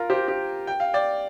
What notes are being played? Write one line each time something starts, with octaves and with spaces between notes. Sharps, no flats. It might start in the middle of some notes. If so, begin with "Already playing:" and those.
Already playing: F4 A#4
G4 C5
G4
G5
F5
D5 G5